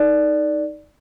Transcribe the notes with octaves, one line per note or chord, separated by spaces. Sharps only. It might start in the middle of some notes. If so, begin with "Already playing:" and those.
Already playing: D#4 A4 D5